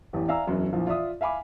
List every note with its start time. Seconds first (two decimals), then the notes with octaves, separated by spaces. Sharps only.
0.13 A1 E2 G4
0.28 D5 E5 F5 G#5 A#5 E6
0.47 E1 F#2 F#3
0.73 A#1 E3 F3
0.87 F4 D5 E5 D#6
1.21 E5 F5 G#5 B5 D6